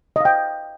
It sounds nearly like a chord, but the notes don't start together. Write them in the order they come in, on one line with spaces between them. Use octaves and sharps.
D#5 F5 G5